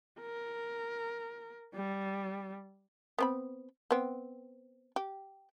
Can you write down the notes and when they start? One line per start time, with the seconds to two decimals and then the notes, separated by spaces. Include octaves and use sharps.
0.20 A#4
1.74 G3
3.19 B3 C4 B5
3.91 B3 C4
4.96 G4